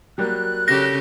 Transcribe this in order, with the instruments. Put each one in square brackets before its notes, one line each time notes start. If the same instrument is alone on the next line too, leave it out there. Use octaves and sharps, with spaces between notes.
[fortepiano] F#3 G3 A#3 [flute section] F#6
[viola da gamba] C#3 G4 A4 [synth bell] A#6